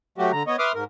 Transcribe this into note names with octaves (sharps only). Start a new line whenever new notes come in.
F#3 A3 F#4 G4
D3 A#5
B3 C#5 D#5
B4 E5 C6 D6 D#6 F6
G#2 A#4